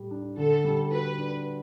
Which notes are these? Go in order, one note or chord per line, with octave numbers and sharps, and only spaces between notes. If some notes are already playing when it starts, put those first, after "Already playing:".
Already playing: A2 G3 G4
D4
D3 A4
G3
F#4 B4
D4